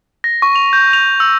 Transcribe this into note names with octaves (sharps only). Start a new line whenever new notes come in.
A#6
C#6
F7
G6
F7
E6